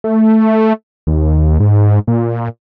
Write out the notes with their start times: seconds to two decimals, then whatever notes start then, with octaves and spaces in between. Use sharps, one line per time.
0.04 A3
1.07 D#2
1.60 G#2
2.08 A#2